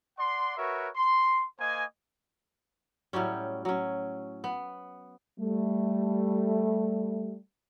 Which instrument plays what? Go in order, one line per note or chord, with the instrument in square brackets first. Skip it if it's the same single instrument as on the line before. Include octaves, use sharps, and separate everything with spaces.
[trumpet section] D5 F#5 C6
F#4 A#4 B4 C#5 E5
C6
A#3 C5 D#5 G#5
[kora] A2 F#3 G3 C#4
F#3 C#4
B3
[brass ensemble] G3 A3